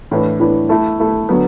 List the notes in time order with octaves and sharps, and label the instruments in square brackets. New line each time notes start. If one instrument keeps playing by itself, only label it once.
[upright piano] A2 E3 D4 B4
A2 E3 D4 B4
A3 E4 A4
A3 E4 A4
D3 F#3 B3